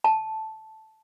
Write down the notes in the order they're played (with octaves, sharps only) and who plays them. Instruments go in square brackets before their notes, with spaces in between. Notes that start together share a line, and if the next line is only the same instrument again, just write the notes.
[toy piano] A5